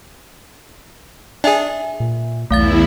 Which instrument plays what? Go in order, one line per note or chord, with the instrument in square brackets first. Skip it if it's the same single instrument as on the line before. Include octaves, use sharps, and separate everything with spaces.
[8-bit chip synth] D4 G#4 [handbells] E5 G#5
[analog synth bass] A#2
[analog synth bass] B1 [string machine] E2 E4 [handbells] A3 F5 A6